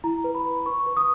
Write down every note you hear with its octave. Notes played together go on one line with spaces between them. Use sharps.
E4 A#5
B4
B5
B4
B4 C#6
B4
D#6